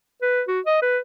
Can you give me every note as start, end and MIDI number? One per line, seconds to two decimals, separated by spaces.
0.22 0.43 71
0.48 0.60 66
0.66 0.78 75
0.82 0.98 71